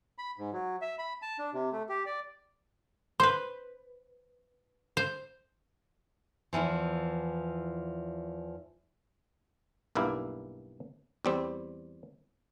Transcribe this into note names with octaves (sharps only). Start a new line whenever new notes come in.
B5
G#2
F#3
E5
B5
A5
D4
C3
A3
G4
D5
B4 C5 C6
C5
E2 G#2 E3 F3
B1 G2 A#3 E4
E2 G3 C4